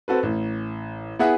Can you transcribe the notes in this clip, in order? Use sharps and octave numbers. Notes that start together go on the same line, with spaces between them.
C4 F#4 A4 B4
A1
B3 E4 G#4 E5 F#5